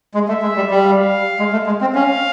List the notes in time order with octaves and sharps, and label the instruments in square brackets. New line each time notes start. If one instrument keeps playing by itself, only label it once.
[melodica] G#3
[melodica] A3 [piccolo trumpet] E5
[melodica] G#3
G3
G3
[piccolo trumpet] F5
[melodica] G#3
A3
G#3
C4
[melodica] C#4 [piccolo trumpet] F5